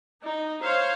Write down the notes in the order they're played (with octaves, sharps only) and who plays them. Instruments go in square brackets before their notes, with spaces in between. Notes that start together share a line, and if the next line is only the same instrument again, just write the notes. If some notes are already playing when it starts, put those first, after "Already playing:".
[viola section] D#4
C5 C#5 F5